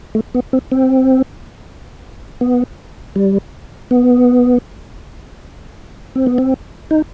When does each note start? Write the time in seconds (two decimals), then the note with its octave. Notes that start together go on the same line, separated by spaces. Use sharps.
0.15 A3
0.34 B3
0.53 C4
0.72 C4
2.41 B3
3.16 G3
3.91 B3
6.16 C4
6.27 B3
6.38 C4
6.91 D#4